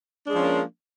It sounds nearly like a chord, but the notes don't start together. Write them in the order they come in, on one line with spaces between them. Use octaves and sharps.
D4 G#3 F3 C#4 A#3